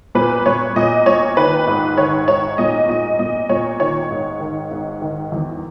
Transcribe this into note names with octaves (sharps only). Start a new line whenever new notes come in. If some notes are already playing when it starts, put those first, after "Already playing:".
A#2 B4
A#2 C#5
A#2 D#5
A#2 C#5
D#3 B4
G#2
D#3 C#5
G#2 C#5
A#2 D#5
A#2 D#5
A#2 D#5
A#2 C#5
D#3 C#5
G#2
D#3
G#2
D#3
E2